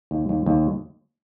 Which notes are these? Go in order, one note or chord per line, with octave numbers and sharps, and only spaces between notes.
D#2
D#2
D#2